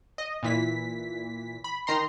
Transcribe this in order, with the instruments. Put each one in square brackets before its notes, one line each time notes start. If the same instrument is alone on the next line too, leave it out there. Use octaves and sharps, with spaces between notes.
[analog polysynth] D#5
A#2 E3 B6
B5
D#3 A#5 C6